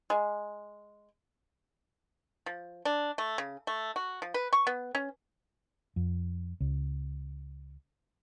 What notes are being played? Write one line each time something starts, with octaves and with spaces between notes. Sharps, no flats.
G#3
F3
D4
A3
C#3
A3
F#4
F3
B4
C#6
B3
C#4
F2
C#2